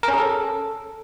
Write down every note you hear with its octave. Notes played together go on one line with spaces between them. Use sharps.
A#4
C#4
G#4
A4